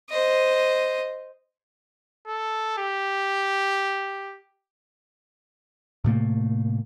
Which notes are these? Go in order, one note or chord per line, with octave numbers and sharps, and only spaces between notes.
C5 D#5
A4
G4
A2 C3 A3 A#3